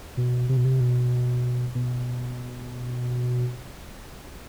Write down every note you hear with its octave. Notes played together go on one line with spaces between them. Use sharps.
B2
C3
B2
C3
B2
B2